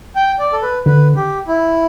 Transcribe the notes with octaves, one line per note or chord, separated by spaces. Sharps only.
G5
D5
A4
B4
D3 B4
G4
E4